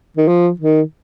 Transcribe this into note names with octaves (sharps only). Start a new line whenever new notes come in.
D#3
F3
D#3